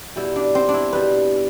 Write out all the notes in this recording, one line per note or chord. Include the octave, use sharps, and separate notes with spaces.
B2 G3 E4
D4
C4
D4
E4
B2 G3 B4